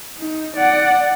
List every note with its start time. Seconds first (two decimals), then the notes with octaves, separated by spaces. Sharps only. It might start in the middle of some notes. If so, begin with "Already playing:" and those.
0.18 D#4
0.56 D5 F#5